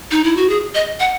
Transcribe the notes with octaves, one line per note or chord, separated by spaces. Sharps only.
D#4
E4
F#4
G#4
D#5
F#5